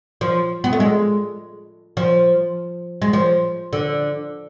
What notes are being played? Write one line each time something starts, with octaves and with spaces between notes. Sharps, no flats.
F3
B3
A3
G#3
F3
G#3
F3
D3